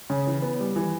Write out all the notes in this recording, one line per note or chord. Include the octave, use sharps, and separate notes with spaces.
C#3
E3
B3
G3
E3